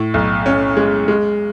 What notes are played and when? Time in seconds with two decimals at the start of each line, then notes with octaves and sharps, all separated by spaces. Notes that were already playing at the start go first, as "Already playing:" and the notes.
Already playing: A2
0.14 B1
0.46 C#4
0.77 G#3
1.08 G#3